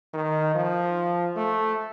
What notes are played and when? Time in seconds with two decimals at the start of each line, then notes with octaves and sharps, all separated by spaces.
0.14 D#3
0.55 F3
1.36 A3